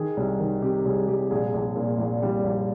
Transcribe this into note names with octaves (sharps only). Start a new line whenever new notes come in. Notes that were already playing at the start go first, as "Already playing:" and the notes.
Already playing: D#3 G#4
C2
D#3
C3 G4
C2 G#4
C2 G4
A#1 G#4
A#1
A#2
A#1
G3
A#1